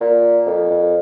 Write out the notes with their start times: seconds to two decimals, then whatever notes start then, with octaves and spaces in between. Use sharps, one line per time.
0.01 A#2
0.46 F2
0.70 F2